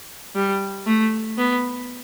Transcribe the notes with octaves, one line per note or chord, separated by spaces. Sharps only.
G3
A3
B3